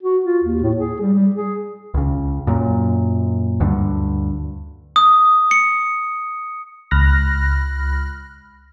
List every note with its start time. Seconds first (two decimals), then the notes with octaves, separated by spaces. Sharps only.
0.03 F#4
0.26 F4
0.44 D#2
0.62 A2
0.76 G#4
1.00 G3
1.14 G3
1.36 G#4
1.94 C#2 C#3
2.47 F#2 A#2
3.60 D2 G2 D3
4.96 D#6
5.51 C#7
6.91 C#2 B5 F6 F#6 A#6